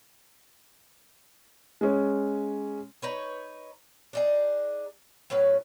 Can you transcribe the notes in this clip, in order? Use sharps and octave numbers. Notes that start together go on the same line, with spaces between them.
G#3 C#4
D#4 B4 C#5
D4 D#4 G#4
A2 F#3 C#4 B4